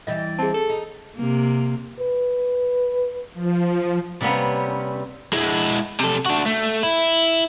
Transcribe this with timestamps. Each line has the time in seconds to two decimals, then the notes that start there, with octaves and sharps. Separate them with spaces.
0.07 E3 G3 D#5
0.39 C4 G#4 A5
0.54 A4
0.69 D#4
1.16 C3 A#3
1.99 B4
3.34 F3
4.21 C3 G3 A#3 B3 C#4
5.33 G#3 E4
6.00 C3 A4
6.26 D4 F#4
6.46 A3
6.83 E4